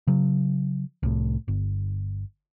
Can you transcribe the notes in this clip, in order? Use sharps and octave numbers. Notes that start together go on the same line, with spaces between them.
C#3 F#3
C2 A2
G1